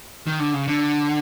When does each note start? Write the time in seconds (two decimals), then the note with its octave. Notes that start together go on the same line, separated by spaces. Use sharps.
0.27 D#3
0.40 D3
0.53 C#3
0.68 D3